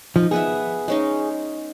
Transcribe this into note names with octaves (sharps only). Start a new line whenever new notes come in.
F3 D#4
B3 G#4 B4 E5
G#3 C#4 D#4